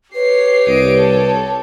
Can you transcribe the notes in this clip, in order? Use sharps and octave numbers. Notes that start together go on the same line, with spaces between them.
G4 B4 C#5 C7
C2 D#5 D7
A4